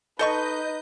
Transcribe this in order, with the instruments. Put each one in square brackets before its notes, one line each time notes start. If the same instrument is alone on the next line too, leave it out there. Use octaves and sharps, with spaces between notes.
[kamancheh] D#4 B4 [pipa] A4 A5 C#6 [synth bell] D#5 G6